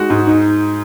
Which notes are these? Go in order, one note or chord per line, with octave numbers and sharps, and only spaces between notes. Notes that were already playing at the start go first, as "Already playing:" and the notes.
Already playing: G#3 D#4 F#4
G#2
D#4